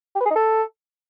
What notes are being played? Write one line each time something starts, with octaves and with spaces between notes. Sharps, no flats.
G4
B4
G#4
D#4
A4